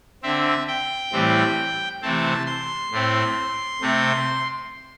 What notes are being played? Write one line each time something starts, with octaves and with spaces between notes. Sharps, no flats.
D3 C4 E5
G5
A2 E3 G3 C4
C3 E3 A3 C4 A5
C6
A2 A3 C4
C3 A3 C4